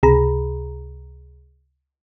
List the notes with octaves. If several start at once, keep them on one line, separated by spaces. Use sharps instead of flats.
C#2 C3 G#4 A#5 B5